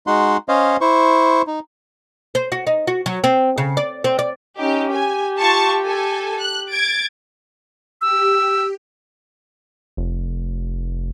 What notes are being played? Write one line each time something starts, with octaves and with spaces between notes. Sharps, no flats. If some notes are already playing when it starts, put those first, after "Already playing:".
G#3 D#4 F#4 F#5 C6
C#4 C5 C#5 D#5 F5
E4 C5 C#6
D#4
C5
F#4
D#4
F#4
F#3
C4
C#3
D5
C4
D5
C#4 D#4 G4
G4 G#5
F4 A5 C#6
A4 G#5
F#6
G#6 A6 D7
G4 E6
F1